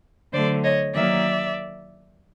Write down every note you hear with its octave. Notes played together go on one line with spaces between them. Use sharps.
D3 F#3 A3 C5 D5
C#5 D#5
D#3 F#3 A#3 D5 E5